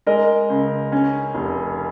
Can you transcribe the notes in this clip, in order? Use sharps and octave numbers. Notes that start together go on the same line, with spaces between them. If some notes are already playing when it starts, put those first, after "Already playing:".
G#3 A#4 D#5
C#2
C#4
F1